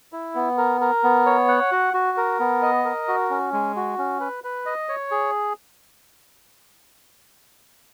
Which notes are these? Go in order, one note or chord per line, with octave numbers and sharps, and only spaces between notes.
E4
B3
A#4
A#4
B3
C#5
F#5
F#4
F#4
A#4
B3
D#5
A#4
F#4
C#4
G#3
F#4
C#4
B4
B4
D#5
C#5
G#4